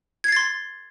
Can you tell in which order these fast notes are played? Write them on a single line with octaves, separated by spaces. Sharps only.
G#6 C7 A6 C6